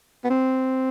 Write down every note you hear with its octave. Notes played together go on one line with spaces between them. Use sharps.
B3
C4